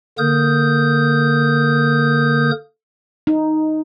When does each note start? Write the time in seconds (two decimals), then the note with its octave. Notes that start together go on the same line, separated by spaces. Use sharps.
0.18 D3 A#3 A#4 D#6 G6
3.27 D#4